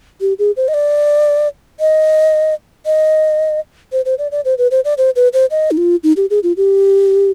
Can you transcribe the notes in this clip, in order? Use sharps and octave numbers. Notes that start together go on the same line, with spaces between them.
G4
G#4
C5
D#5
D5
D#5
D#5
C5
C5
D5
D5
C5
B4
C5
D5
C5
B4
C5
D#5
D#4
F4
D#4
G4
G#4
F4
G4